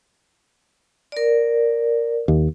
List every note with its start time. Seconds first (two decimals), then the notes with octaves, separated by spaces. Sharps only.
1.12 A#4 D5
2.28 D#2